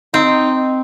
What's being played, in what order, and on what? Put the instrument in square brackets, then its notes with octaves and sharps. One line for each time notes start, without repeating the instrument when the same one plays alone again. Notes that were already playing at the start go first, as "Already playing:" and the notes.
[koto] C4 [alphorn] D#4